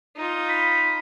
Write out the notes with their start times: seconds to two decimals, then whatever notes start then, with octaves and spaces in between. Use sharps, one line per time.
0.16 D#4 F4
0.49 B5